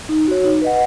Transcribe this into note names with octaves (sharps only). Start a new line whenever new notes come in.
D#4
F#4 C#5
D#4
B4 D#5 F#5